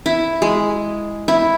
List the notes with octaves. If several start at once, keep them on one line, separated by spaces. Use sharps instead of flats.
E4
G#3
E4